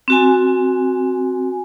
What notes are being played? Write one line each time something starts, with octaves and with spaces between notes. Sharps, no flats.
C4 F#4 G#5